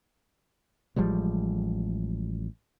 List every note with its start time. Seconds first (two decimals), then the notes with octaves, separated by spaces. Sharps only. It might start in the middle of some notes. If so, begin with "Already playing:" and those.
0.96 A1 F3 G3 G#3